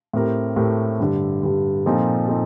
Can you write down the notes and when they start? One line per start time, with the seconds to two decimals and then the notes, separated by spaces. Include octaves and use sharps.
0.13 A2 A3 C4 G4 A#4
0.56 A2 A3 C4 G4 A#4
1.00 G2 D3 G3
1.43 G2 D3 G3
1.86 A#2 F3 C4 D#4 A4
2.28 C4 D#4 A4